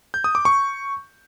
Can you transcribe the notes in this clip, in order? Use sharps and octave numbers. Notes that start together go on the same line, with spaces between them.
G6
D#6
D6
C#6